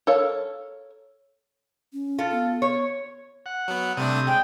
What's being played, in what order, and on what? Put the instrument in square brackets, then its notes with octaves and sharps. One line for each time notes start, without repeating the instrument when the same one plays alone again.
[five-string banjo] A4 A#4 C#5 F5
[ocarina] C#4
[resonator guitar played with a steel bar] F4 A4
[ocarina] B3
[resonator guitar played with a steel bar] C#5
[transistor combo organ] F#5
[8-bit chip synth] F#3 B3
[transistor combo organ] C3 D#6 [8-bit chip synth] G3 A3 D4
[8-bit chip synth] G#3 [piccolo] G5